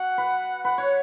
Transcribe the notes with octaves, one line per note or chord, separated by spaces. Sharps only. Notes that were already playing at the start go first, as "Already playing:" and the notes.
Already playing: F#4 F#5
B4
B4 F#5
C#5